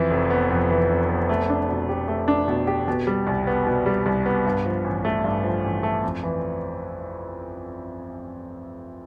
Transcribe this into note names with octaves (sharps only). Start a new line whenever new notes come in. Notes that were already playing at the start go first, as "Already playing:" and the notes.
Already playing: F2 E3
F1
B3
F2
E3
F1
B3
A3
D4
B2
G4
A3
D4
B2
G4
B2
G3
C2
B3
B2
G3
C2
B3
G2
F3
A1
A3
G2
F3
A1
A3
F2
E3